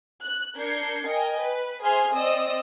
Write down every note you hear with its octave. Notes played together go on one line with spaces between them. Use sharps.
F#6
D4 A#4 G6 G#6 C7 C#7
A#4 D#5 G5 G#5
B4
G#4 C5 E5 G#5 C6 F6
C4 D5 D#5 D#6 E6